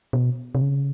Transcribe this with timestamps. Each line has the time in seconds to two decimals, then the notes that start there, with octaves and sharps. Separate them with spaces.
0.13 B2
0.55 C3
0.62 C#3